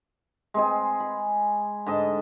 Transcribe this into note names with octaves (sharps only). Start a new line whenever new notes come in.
G#3 C4 G#4
B5
G#2 D3 D#5 A5